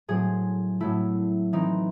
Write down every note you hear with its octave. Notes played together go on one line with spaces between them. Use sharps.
A2 F#3 C4 G#4
A2 F#3 A3 E4
E3 C4 D#4